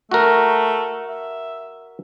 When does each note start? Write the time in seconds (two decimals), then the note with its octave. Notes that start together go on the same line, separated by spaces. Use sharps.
0.12 A3 F#4 A#4
1.08 E5